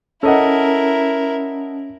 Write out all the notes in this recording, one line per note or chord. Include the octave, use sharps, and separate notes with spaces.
C#4 E4 A4 A#4 D#5 F#5